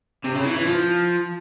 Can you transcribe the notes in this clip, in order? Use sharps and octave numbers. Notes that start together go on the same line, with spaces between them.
C3
C#3
E3
E3
F3